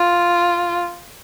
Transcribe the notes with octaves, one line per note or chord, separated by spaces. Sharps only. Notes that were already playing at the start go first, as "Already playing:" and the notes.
Already playing: F4